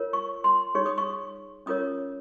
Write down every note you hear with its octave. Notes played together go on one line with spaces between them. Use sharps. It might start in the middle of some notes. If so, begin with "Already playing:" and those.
Already playing: F4 A#4 C#5
C#6
C6
D#4 G#4 C#5 C#6
D#6
C#6
C#4 F4 A#4 C#5 D#6